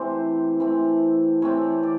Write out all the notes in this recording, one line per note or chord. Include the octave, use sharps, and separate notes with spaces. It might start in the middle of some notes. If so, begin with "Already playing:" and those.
Already playing: C3 E3 A3 C4 C5
C3 E3 A3 C4
C3 E3 A3 C4 C#5
D5